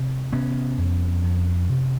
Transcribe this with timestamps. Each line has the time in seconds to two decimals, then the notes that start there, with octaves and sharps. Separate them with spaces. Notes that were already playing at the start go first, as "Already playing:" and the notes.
Already playing: C3
0.33 C3 B3 C#4
0.78 F2
1.24 F2
1.69 C3